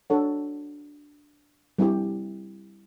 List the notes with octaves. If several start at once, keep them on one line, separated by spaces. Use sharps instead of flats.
D4 F#4 A4 C#5 F#5
G3 C4 E4 G4